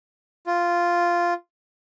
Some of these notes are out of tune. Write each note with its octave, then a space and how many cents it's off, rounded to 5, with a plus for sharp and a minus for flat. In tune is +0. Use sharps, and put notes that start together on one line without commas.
F4 -5